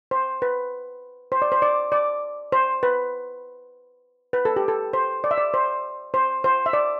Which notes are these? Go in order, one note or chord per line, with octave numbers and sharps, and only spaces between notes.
C5
B4
C5
D5
C5
D5
D5
C5
B4
B4
A4
G4
A4
C5
D5
E5
D5
C5
C5
C5
E5
D5